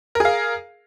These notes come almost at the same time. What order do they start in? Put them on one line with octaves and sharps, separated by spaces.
A#4 G#4 F5